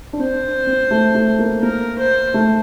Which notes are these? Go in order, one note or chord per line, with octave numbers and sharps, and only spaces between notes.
D4
C4 C5
C4
A3
A3
A#3
A#3 A#4
C5
A3